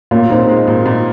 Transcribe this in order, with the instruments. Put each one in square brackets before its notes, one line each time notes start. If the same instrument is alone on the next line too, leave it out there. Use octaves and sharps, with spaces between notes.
[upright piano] A#2 [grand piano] A#3 C#4
[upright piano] A#2 [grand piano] C4 D#4
[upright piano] G#3
A#2
A#2